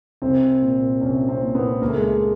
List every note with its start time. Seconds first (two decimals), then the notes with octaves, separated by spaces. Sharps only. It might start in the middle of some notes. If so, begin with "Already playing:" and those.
0.22 C2 C4
0.62 A#2
1.01 C2 C#4
1.28 C4
1.41 A#2
1.55 B3
1.81 C#2 A#3
1.89 A3
1.95 G#3
2.02 A3